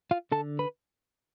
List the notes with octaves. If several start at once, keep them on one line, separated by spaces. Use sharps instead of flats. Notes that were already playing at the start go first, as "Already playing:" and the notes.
F4 F5
D3 A4 A5
B4 B5